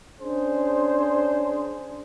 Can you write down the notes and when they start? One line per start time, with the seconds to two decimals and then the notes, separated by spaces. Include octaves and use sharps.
0.21 C#4 D4 G#4 C5